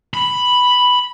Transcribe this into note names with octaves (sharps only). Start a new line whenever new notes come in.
B5